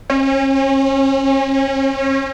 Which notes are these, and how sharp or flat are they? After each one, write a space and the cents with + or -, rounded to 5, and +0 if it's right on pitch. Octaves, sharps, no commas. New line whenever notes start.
C#4 -35